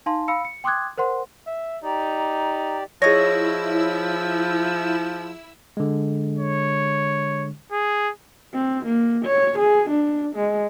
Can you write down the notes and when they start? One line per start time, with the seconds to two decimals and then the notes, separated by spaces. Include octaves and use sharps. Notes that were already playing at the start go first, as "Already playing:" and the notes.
0.06 D#4 F5 A5 C6
0.28 F5 B5 E6 C#7
0.45 C#7
0.64 G5 C6 D6 D#6 F#6 G#6
0.98 A#4 C5 F#5 C6
1.47 E5
1.83 D#4 G4 D5 A#5
3.02 F3 E4 G#4 C#5 D#5 E6 A#6
5.77 D3 G#3
6.39 C#5
7.72 G#4
8.54 C4
8.86 A#3
9.25 C#5
9.59 G#4
9.90 D4
10.36 G#3